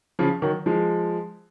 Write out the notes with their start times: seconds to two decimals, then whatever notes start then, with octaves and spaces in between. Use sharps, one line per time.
0.19 C#3 F3
0.42 D#3 F#3
0.66 F3 G#3